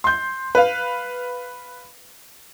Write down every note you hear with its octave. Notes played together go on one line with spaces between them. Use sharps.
C6 G6
B4 F5